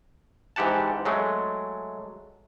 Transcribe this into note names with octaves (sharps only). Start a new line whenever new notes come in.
G#2 E3 G4 F#5 A5
F#3 G#3 A3